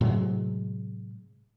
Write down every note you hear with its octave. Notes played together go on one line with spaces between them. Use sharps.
A2 C3 F#3 G#3